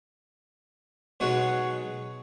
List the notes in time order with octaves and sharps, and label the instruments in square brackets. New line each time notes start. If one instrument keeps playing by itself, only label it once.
[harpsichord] B2 F#3 G#3 D#4 C#5 F#5